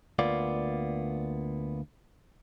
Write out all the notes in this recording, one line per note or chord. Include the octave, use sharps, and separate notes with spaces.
D2 A#3 B3 F4 D5